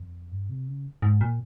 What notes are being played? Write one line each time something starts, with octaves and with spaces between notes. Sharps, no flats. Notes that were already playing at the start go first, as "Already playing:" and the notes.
Already playing: F2
G2
C3
C#3
G#2
A#2